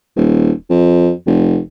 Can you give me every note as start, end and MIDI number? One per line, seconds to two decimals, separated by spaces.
0.16 0.51 27
0.70 1.11 41
1.27 1.58 29